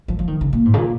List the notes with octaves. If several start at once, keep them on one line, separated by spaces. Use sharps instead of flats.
F3
F3
D#3
C#3
A#2
G#2
C#3
A#2